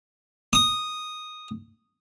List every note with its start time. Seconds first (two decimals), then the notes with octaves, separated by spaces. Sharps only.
0.53 D#6